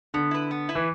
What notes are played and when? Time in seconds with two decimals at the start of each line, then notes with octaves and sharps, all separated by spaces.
0.14 D3 B3
0.31 E4 B4
0.51 B3
0.69 E4 B4
0.75 E3